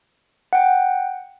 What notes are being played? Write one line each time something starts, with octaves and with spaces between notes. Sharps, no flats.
F#5 G5